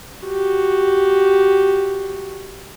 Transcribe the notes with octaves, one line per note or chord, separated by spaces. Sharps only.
F#4 G4